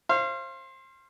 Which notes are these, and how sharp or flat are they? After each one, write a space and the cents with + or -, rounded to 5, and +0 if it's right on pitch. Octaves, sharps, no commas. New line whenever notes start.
C5 +25 F5 -30